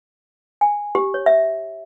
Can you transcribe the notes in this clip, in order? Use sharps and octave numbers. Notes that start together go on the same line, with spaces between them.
G#5
G4
C#5
E5